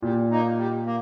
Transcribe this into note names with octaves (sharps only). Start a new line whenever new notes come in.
A#2 G3
A#3 D#4
G3
A#3